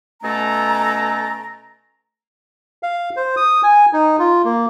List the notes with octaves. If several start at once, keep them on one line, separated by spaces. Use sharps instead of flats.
B2 A3 C#4 A4 A#5
F5
C5
D#6
G#5
D#4
F4
A#3